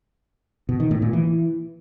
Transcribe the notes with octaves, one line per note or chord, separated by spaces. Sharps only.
B2
D#3
A2
A#2
E3